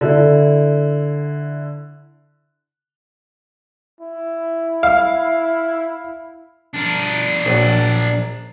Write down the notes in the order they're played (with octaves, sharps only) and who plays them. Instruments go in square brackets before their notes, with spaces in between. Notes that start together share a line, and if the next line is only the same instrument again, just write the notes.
[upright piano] D3 E4
[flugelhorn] E4
[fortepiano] F5
[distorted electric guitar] D4 A#4
[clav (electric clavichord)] A#1 F#3